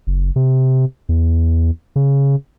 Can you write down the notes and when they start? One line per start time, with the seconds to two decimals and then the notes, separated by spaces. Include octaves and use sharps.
0.07 F#1
0.36 C3
1.09 E2
1.96 C#3